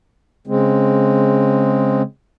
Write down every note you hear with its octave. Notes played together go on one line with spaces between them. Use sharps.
C#3 G#3 C4